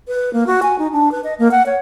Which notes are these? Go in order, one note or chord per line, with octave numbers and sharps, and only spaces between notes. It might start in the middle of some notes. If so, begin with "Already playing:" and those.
B4
A#3
F#4
G#5
D#4
D4
B4
D#5
A#3
F#5
C#5